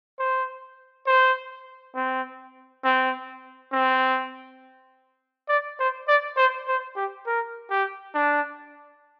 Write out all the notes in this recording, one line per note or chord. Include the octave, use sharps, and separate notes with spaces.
C5
C5
C4
C4
C4
D5
C5
D5
C5
C5
G4
A#4
G4
D4